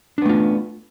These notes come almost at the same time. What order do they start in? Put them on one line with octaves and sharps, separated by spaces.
D4 B3 A3 F4